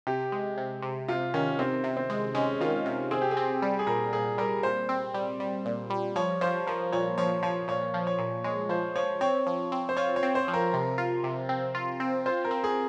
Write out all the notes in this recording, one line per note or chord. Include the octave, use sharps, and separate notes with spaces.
C3 G4
G#3
C3
C3
C3 F4
D#3 C#4
C3 C4
C3
C4
G#3
G#3 C#4
D#3 F4
C3
C4 G#4
G4
G#4
C4
G3
G#4
A#2 A#4
A#2 G#4
G3 A#4
A#2 C5
C4
G3
G3
A#2
G3
F3 C#5
F3 C5
F3 A#4
A#2 C#5
F3 C#5
F3 C#5
A#2 C#5
F3
C#5
A#2
G#3 C#5
F3 C5
F3 C#5
C4 C#5
F3
C4
C5
F4 C#5
C#5
C4
C5
F3
A#4
C3
F4
C3
C4
F4
C4
F4 C5
A#4
C4
G#4